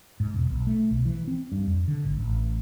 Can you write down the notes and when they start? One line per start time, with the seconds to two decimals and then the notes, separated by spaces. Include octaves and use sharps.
0.20 G#2
0.34 E1
0.50 B1
0.67 A3
0.91 B1
1.05 E3
1.27 C4
1.52 G2
1.67 F2
1.88 D3
2.04 G#1
2.18 A1